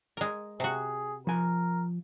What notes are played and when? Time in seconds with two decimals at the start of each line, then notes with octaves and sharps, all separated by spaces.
0.17 G#3 A#4
0.60 C3 F#4 G#4
1.27 F3 A#4 G#5